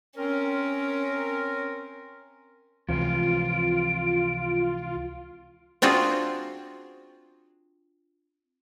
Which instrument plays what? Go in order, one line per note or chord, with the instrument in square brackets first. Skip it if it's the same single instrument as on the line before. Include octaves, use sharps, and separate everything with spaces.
[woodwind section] C4 A#4 [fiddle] C#4
[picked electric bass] C#2 E3 [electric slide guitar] C3 F3 [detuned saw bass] F4 [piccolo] D7
[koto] C4 D4 F4 F#4 G#4